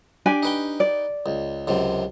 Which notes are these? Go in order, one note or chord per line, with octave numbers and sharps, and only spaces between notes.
D4 G4 G#5
D#4 B4 G5
D5
C#2
C#2 F#2 C3